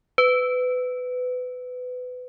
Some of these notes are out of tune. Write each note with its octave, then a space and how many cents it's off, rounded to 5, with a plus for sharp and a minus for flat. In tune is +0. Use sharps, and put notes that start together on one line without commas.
B4 +25